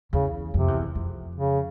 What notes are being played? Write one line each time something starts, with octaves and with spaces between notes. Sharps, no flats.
E2 C#3
F2 C3
E2
F2
C#3